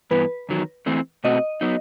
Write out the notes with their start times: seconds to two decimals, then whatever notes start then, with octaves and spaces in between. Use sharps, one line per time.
0.11 G2 E3 B3 B4
0.49 E2 D#3 F#3
0.86 E3 A3 C4
1.24 B2 A3 C4 F#4 D#5
1.61 F#3 B3 D#4